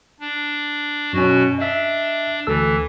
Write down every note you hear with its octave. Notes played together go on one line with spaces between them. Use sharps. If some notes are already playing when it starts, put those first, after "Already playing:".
D4
F#2 B2 C#4 F#4
D4 D#5 E5
D2 E3 A4 E6